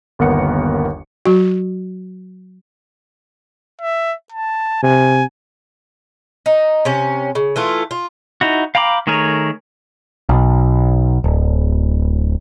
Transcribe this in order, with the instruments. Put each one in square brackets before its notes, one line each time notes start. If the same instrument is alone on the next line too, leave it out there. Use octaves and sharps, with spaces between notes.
[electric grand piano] G1 D#2 B3 A#4 F#5 C#7
[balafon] F#3 F#4
[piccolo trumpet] E5
A5
[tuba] C3 [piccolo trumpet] G#5
[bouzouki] D#4
C3 C#4
C#3
E3 A3 F4
F4
[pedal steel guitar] D#4 E4 F#4
F5 G5 A#5 B5 D6
D#3 A3 G#4 A#4 C#5
[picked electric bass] B1
D1